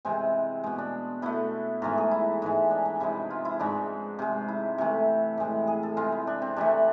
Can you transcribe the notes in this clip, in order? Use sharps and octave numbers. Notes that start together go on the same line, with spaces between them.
C3 E3 G#3 C4
B2 G#3
D4
B2 A3 E4
G#2 E3 A3 F4
G#4
E4
G#2 E3 G#3
D4
D4
C3 F3 G#3 E4
F4
E4
G#2 F3 G#3 D4
C3 G#3
E4
C3 E3 A3
A2 E3 G#3
G#4
A4
C3 G#3 F4
E4
D4
C4
C3 E3 A3 D4